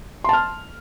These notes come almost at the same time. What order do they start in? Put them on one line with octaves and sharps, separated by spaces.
C6 A5 F6